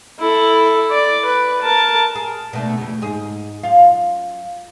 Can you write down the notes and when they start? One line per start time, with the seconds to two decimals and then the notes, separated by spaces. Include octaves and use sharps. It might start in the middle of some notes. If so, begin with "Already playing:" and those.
0.19 E4 A4
0.90 D5
1.25 B4
1.62 A#4 A5
2.15 G#4
2.53 B2 A3 D4
2.77 F2 C#3
3.02 G#2 G#4
3.63 F#2 F4 F5